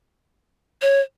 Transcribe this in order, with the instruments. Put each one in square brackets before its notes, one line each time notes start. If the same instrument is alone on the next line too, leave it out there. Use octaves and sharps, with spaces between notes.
[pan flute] C#5